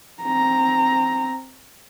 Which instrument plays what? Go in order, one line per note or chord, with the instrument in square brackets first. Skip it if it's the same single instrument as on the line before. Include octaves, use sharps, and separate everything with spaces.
[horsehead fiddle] C4 A#5